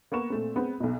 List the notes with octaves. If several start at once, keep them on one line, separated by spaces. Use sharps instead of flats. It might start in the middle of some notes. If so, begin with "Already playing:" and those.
A#3 B3 C#6 E7
A#2 A3 C4
G#3 B3 C4
B1 B2